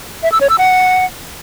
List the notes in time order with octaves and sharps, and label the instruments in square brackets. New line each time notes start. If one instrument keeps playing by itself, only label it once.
[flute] E5
E6
C#5
E6
F#5